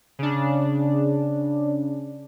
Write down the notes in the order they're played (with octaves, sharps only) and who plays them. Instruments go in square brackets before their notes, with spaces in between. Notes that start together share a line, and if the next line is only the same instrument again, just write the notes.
[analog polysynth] C#3 D4